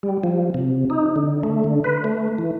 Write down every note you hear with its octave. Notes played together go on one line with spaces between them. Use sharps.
G3
F3
C3
D#4
D3
A3
D3
B4
A3
E3